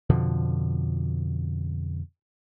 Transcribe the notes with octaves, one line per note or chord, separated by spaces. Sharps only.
F2 B2 D3 F3